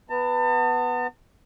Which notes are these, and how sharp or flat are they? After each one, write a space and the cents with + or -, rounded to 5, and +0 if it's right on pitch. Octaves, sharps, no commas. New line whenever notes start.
B3 +0 A5 +40